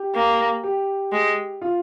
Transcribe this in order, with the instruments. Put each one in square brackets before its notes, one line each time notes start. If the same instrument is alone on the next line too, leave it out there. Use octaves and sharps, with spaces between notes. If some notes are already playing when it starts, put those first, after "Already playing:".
Already playing: [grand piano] G4
[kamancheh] A#3
[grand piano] G4
[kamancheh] G#3
[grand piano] F4